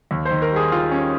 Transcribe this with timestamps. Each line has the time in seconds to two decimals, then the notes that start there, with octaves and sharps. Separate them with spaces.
0.11 D#2
0.25 C5
0.31 D#3
0.42 A#4
0.52 G3 G#4
0.72 D#3 F4
0.91 G3 C#4